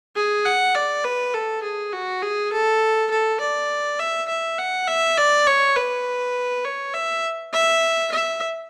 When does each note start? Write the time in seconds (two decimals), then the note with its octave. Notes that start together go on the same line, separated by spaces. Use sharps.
0.16 G#4
0.45 F#5
0.75 D5
1.04 B4
1.34 A4
1.63 G#4
1.93 F#4
2.22 G#4
2.52 A4
3.11 A4
3.40 D5
3.99 E5
4.29 E5
4.58 F#5
4.88 E5
5.17 D5
5.47 C#5
5.76 B4
6.65 C#5
6.94 E5
7.53 E5
8.12 E5